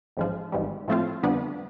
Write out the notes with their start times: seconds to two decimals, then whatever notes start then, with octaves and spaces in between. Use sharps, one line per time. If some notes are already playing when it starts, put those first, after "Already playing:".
0.17 A1 G#2 F3
0.52 G#1 G#2 E3 G3
0.88 A2 F3 A3 C4 F4
1.23 F2 D3 G3 B3 D4